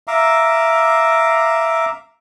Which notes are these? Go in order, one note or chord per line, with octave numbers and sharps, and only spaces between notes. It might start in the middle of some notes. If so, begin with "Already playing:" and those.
E5 F5 A#5 D6